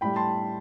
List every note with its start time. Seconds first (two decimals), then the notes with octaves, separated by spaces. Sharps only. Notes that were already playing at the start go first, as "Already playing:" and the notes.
0.01 A2 G3 G5 B5
0.16 A5 C6